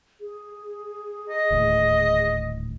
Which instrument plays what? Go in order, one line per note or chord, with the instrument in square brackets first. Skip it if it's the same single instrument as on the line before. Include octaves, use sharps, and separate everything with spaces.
[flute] G#4
[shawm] D#5
[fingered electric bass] D#1 D2 A2